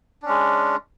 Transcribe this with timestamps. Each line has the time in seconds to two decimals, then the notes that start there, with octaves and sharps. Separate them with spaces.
0.22 D4
0.25 C#4
0.29 G#3